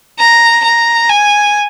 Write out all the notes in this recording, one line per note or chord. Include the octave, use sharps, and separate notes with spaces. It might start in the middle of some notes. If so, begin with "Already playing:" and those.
A#5
A#5
G#5